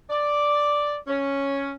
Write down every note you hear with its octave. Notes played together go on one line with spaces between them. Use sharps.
D5
C#4